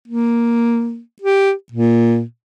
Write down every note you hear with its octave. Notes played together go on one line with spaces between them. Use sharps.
A#3
G4
A#2